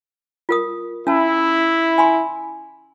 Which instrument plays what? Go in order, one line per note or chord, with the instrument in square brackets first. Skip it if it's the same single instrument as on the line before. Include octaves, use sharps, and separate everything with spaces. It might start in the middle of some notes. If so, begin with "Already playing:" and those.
[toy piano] F4 A#4 D#6
[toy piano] C#4 A5 [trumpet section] E4
[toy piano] G#5 B5 C6